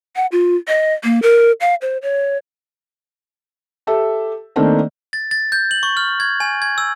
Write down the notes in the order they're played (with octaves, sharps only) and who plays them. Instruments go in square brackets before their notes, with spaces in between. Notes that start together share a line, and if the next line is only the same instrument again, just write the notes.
[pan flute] F#5
F4
D#5
A#3
A#4
F5
C5
C#5
[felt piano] G4 A4 E5
D#3 A3 A#3 C4 D4
[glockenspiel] A6
A6
G6
F#7
C#6
F6
G#6
G#5
G#6
E6